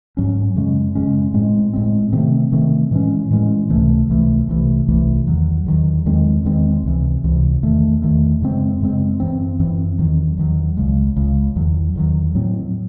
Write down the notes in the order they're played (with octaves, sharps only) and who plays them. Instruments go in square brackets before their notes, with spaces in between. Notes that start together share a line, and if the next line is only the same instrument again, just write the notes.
[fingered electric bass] G#2 F#3 C#4
F#2 C#3 G#3 C#4
F#2 C#3 G#3 C#4
A2 G#3 C4
A2 G#3 C4
C3 D#3 A3 C4
C3 D#3 A3 C4
A2 E3 G#3 C#4
A2 E3 G#3 C#4
C#2 C3 E3 A3
C#2 C3 E3 A3
C2 C3 E3 A3
C2 C3 E3 A3
E2 D#3 F#3
E2 D#3 F#3
E2 D#3 G#3 C4
E2 D#3 G#3 C4
C#2 C3 E3
C#2 C3 E3
E2 D#3 A3
E2 D#3 A3
F#2 C#3 G#3 C4
F#2 C#3 G#3 C4
F#2 E3 C4
F#2 E3 C4
E2 D#3 F#3
E2 D#3 F#3
C#2 C#3 G#3
C#2 C#3 G#3
E2 D#3 F#3
E2 D#3 F#3
A2 F#3 C4